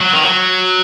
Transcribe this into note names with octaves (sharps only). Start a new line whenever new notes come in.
F#3
D#3
F#3